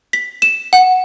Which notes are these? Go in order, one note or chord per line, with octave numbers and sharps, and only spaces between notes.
B6
E7
F#5